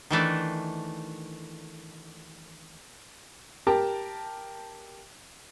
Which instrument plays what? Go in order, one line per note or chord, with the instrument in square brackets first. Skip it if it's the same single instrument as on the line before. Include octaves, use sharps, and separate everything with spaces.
[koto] D#3 E3 A3 D4
[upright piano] G4 A#4 G5 A5